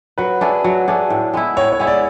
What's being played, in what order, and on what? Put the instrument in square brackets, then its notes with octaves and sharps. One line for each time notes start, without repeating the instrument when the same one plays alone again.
[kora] F#3 [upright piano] B4
[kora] A3 D4 G#4
F#3
A3 D4 G#4
A2
G#3 B3 E4
[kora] A2 [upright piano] C#5
[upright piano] C#5
[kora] G#3 B3 E4
[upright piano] D5